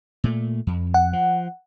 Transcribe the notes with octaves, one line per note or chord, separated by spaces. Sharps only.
A#2 A3
F2
F#5
F3